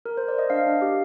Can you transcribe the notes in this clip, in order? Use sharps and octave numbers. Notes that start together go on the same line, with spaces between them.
A#4
C5
D5
D#5
D4 F5
D4
G4